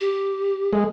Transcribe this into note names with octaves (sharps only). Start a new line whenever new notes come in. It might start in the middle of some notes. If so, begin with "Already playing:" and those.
G4
G#3